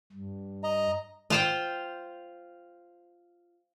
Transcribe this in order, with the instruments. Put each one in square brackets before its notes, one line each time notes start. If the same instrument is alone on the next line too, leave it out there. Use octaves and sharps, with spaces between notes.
[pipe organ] G2
[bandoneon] D#5 A#5
[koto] F4 C5 G5